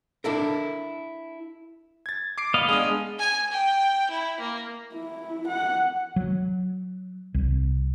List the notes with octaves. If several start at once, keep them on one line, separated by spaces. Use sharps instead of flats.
D4 E4 A4 A#4
G#6 A6
D6 C7 D7
B3 D#5 F5
G#3 D4 G#4
G#5
G5
E4
A#3
E4
F#5
F#3
C2